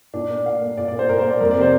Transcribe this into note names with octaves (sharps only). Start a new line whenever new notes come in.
A#2 D4
A#3
D5
A#2 F5
A#3
A#2 D5
D5
A#3
C5
A#2 A#4
C5
A#3
D5
F2 A#4
D5
C3 A#3 C5